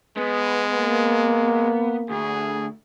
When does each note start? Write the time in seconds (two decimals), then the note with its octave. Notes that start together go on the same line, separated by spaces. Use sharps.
0.17 G#3 B3
0.76 A#3
2.09 D2 G#4